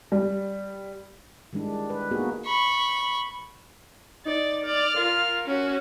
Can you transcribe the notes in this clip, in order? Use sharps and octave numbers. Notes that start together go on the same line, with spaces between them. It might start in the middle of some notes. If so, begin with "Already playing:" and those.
G3
D#3 G3 G#3 D4 E4
B4
A#3 B3 D#4 F#4 G#4 B4
B5 C#6
D#4 D5
D5 F6
F4 A#4
C#4 F#4